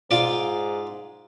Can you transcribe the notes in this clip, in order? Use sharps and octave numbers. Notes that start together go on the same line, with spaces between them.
G#2 F4 D5